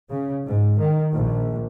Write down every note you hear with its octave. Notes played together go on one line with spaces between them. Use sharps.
C#3
G#2
D#3
A#1